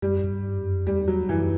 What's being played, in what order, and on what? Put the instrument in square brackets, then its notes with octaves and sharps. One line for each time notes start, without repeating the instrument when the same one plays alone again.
[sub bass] F#2 [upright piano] G3
[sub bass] F#2
G2
F#2
[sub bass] E2 [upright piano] G3
[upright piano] F#3
[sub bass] F#2 [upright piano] E3